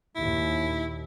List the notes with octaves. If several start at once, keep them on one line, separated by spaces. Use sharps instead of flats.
D#2 A#2 E4